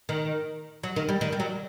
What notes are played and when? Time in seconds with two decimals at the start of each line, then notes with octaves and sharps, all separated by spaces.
0.09 D#3
0.83 F#3
0.96 D#3
1.09 G3
1.21 D#3
1.32 G3
1.40 F#3